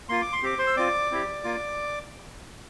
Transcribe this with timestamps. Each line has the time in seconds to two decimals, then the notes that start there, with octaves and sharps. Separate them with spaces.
0.09 A#3 F4 C6
0.22 D6
0.33 C6
0.43 C4 G4 D6
0.59 C5 C6
0.67 E6
0.76 C4 F4 D5 D6
1.11 C4 E4 G4
1.44 A#3 F4